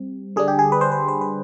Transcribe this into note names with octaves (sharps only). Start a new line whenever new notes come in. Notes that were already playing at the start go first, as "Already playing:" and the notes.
Already playing: G3 C4
D3 G3 D4 G#4
G4
G#4
B4
C5
B4
C5
B4